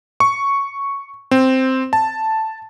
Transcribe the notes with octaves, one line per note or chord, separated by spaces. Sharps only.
C#6
C4
A5